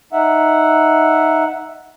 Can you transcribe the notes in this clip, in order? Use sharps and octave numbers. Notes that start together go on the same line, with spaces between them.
D#4 E5 F#5